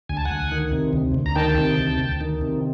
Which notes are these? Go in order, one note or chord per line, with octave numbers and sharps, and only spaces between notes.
D2 G#5
A5
D2 F#5 G#5
D#3
C3
D2
D2
A#5
D#3 G5 A5
C3
D2
D2
D#3
C3